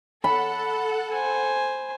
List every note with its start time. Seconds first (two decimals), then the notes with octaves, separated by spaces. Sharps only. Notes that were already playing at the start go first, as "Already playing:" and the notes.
0.24 A4 F#5 B5
1.13 C5 G#5